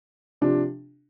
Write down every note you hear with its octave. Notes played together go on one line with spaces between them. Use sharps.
C3 F3 D4